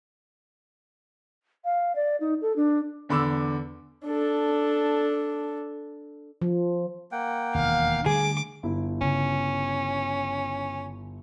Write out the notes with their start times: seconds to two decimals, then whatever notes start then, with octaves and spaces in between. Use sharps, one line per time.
1.64 F5
1.95 D5
2.20 D#4
2.42 A4
2.56 D4
3.09 E2 D3 B5 D6 E6
4.05 D4 A4
6.42 F3
7.12 A#3 F#5 G5
7.55 E1 D#2 F5
8.06 D3 G3 A3 G#4 D6
8.63 G1 E4
9.01 C#3 C#4